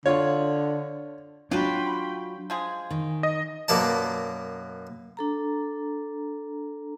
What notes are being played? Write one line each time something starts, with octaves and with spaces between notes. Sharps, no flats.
D3 F4 C#5
F#3 C#4 D4 F4 F#4 G5 B5
F3 G#3 G#4
D#3
D#5
F#2 B2 A#3 D5 A5
D4 A4 A#5